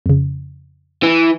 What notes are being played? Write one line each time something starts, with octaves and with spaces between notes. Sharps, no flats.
F2 C#3
E3